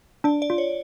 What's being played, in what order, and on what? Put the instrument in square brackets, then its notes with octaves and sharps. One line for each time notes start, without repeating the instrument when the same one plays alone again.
[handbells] D4 [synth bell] D5
[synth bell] D5
[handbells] F4
[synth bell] C#5